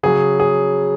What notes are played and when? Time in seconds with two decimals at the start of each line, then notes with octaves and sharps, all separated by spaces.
0.03 C#3 F#3 G#4
0.40 G#4